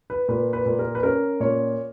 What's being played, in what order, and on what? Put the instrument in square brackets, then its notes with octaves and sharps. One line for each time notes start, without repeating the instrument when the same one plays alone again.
[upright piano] B4
A#2 B4
B4
A#2
A#4
B4
C#4 A#4
A#2 C#5